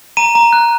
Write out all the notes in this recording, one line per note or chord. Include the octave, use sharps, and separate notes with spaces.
A#5 D#7
A#5
F#6